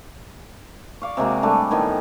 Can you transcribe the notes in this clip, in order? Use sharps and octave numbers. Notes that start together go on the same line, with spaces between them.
D5 F5 C#6
C3 G#3 A#3 F#4
G3 A3 D4
A2 D#3 B3 G#5